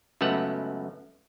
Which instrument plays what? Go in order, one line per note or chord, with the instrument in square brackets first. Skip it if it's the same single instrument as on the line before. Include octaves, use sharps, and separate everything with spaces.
[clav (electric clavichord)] C#2 F#2 A3 B3 F#5